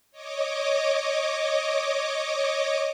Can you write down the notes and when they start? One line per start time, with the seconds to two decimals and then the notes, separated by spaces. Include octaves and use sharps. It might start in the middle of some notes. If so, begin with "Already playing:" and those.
0.11 C#5 D#5 D6